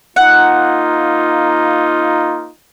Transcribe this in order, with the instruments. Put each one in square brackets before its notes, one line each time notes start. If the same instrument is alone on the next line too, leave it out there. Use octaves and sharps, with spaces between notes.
[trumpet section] A#3 D#4 F4 [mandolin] F#5